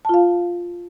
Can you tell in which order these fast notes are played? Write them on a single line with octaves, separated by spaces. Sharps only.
A5 F4 F5